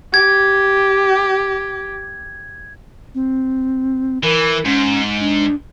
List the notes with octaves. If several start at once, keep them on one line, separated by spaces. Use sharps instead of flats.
G4 G#6
C4
E3 A#4
G#2 C#4
D4